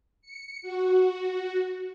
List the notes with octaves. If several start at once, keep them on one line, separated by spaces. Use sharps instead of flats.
C#7
F#4